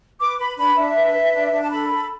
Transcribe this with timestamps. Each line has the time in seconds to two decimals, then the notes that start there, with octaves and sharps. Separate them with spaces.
0.20 B4 D6
0.39 B4 B5
0.58 D4 B5
0.76 D4 E5
0.95 B4
1.14 B4
1.34 D4
1.52 D4
1.61 A5
1.70 A4 B5
1.90 A4